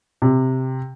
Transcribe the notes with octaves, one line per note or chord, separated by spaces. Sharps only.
C3